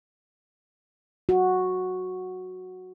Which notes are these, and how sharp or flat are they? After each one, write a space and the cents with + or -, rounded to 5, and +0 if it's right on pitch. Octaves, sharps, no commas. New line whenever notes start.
F#4 -5